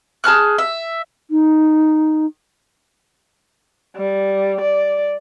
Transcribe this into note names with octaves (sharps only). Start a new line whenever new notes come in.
G#4 A5 F6 F#6
E5
D#4
G3
D5